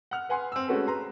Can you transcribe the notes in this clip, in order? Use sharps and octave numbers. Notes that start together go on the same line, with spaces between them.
F#5 F6
B4 F#5 G#5 C6
C4 E6
G#3 A3 C#4 F#4 A4 B4
B4 A#5 C6